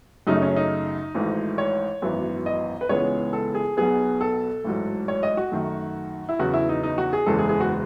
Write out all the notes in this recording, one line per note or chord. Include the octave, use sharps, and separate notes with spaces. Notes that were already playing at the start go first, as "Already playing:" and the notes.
F#2 C#3 F#3 A3 D#4
C#4
D#4
G#1 G#2 E3 A3
C#5
G#1 F#2 E3 B3
D#5
B4
C#2 C#3 E3 G#3 B3 C#5
A4
G#4
B1 B2 F#3 B3 G#4
A4
A1 G#2 F#3
C#5
D#5
F#4
F#2 D#3 A3
E4
E2 C#3 F#3 B3 F#4
E4
D#4
D#4
F#4
G#4
F#1 E2 C#3 E3 G#3 A4
G#4
G#4
F#4